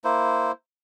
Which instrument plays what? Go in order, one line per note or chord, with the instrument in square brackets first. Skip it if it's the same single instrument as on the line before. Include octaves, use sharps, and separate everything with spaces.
[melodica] A#3 E4 C5